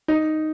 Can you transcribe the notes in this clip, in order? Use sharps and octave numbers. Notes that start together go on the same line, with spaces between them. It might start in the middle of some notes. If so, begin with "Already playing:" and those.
D#4